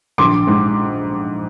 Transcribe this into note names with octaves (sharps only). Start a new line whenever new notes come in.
A#1 C6 D6
G#2